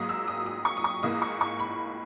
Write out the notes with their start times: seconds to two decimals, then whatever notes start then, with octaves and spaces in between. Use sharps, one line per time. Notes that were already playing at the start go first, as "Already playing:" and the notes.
Already playing: G#2 F#3 A#3 D#6
0.09 E6
0.28 D#6
0.46 D#6
0.65 C#6
0.77 D#6
0.84 C#6
1.03 G#2 E3 A#3 D#6
1.22 C#6
1.41 C#6
1.59 B5